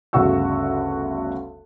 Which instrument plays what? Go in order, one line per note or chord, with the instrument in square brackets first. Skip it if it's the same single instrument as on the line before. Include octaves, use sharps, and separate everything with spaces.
[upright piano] G1 D2 C#3 F#4 C#6 E6